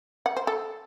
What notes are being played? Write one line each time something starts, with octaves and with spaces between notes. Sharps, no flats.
F#5
C5
A4